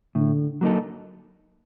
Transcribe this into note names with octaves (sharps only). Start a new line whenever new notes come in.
A2 D3
F#3 A#3 D#4 A4